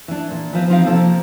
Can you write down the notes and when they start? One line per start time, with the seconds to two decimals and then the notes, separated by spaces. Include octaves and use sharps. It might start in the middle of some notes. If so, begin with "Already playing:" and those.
0.08 E3 D4
0.31 A#2
0.53 E3 F3 B3
0.69 F3 C4 D#4 F4 F5
0.86 C3 F3 A#3 C4 A4